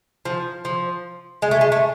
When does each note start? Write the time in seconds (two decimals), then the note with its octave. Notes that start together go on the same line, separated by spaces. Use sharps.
0.25 F3
0.65 F3
1.42 G#3
1.51 A3
1.61 G#3
1.72 A3